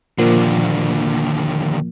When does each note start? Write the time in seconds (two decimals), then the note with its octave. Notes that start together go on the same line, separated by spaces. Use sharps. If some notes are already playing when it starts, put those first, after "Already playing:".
0.18 D#2 A#2 D3 F3 A#3